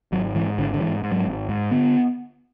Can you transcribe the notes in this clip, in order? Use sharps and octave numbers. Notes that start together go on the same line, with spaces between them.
G#1 F#3
G#2 E3
G#1 D3
D3
G#2 E3
G#2
F#3
G#1
G#2
D3 B3